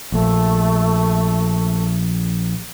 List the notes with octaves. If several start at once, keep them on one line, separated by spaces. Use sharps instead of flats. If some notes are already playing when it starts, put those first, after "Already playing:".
A#1 A3